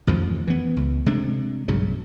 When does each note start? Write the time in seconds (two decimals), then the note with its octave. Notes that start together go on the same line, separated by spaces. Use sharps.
0.07 A1 F2 D#3 F3
0.47 E3 B3
0.77 C#2
1.06 C3 G#3 A3 D4
1.68 B1 G2 C#3 F#3